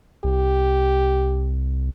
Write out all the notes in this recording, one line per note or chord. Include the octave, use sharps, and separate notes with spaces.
C2 G4